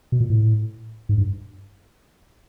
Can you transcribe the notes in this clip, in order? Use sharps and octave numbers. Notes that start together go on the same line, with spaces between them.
B2
A#2
A2
G#2
G2